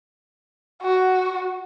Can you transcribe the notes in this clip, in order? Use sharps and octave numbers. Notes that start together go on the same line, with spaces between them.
F#4